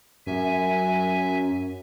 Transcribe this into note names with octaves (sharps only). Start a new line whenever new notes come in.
F#2 E5 G#5